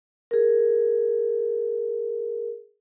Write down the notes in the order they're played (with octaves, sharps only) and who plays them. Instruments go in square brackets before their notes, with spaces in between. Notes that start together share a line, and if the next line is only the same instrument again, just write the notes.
[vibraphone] G#4 A#4